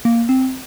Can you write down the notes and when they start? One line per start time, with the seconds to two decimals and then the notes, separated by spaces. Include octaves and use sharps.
0.05 A#3
0.29 C4